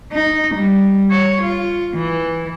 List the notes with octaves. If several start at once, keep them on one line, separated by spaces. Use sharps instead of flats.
D#4
G3
C#5
F4
E3